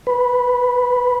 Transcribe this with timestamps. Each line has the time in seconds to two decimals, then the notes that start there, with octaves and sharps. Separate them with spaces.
0.07 B4